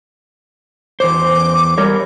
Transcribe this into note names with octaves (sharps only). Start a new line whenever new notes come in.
E2 C5 D6
G3 A#4 C#5